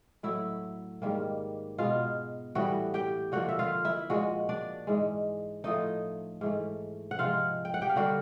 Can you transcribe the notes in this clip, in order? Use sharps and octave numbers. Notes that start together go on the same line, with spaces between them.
A2 F#3 A3 E4 E5
G#2 D#3 G3 A#3
B2 G#3 B3 F4 F5
A2 E3 G3 B3 F#4 F#5
G4 G5
D3 F3 A#3 F#4 F#5
E5
F4 F5
E4 E5
A#2 F3 G#3 F#4 F#5
D4 D5
G#2 E3 G#3
A2 F3 A3 D#4 D#5
G#2 E3 A3
F#5
C3 F3 G#3 F4 F5
G5
F#5
G4 G5
F5
D3 G3 A#3 F#4 F#5